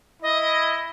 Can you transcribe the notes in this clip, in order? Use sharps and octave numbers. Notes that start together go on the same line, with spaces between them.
E4 D#5